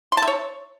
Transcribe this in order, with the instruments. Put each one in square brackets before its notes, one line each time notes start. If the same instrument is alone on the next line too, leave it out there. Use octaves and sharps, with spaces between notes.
[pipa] C6
A5
E5
C#5